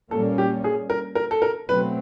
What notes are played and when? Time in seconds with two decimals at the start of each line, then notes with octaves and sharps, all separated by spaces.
0.11 A#2 G3 A#3 C#4 A4
0.38 G4
0.64 G#4
0.90 A#4
1.15 A#4
1.31 A4
1.42 A#4
1.68 B2 F#3 A3 C4 B4